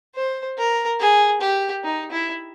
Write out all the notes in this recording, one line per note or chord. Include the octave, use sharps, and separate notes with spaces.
C5
A#4
G#4
G4
D#4
E4